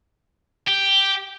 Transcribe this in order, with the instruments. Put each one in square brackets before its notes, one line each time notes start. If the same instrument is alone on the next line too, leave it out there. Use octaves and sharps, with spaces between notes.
[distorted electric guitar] G4